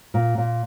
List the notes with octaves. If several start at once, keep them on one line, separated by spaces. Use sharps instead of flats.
A#2
A#2